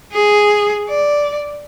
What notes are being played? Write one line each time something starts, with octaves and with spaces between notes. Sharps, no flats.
G#4
D5